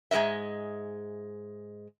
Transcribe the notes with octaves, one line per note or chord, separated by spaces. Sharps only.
G#2 G#3 A#4 D#5 E5